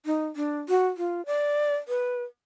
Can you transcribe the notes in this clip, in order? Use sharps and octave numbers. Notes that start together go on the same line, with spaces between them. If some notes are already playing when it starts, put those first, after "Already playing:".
D#4
D4
F#4
F4
D5
B4